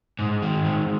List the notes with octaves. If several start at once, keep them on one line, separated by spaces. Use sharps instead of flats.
G#2
D#3
G#2